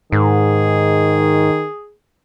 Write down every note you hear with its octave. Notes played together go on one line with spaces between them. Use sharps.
G#2 D#3 G#4